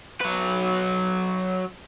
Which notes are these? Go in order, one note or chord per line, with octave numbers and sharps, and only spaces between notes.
F#3 B4